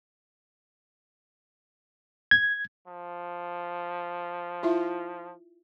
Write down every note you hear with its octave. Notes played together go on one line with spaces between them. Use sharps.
G#6
F3
E4 F4 E5